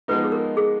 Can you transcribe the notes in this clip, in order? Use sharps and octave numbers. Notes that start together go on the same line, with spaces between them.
F3 G#3 B3 D#4 B4
G#4
A#4
G#4